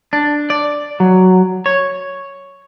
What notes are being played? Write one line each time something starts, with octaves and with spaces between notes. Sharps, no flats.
D4
D5
F#3
C#5